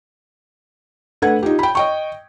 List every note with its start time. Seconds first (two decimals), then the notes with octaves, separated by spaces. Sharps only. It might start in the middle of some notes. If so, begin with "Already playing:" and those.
1.22 A3 D4 B4 F#5 G#6
1.43 D#4 F4 G4
1.59 G5 B5
1.75 D#5 G5 C#6